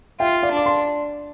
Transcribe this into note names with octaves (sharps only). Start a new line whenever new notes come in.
F4 E5 G5
D5 F5
D4
D6
A5 C6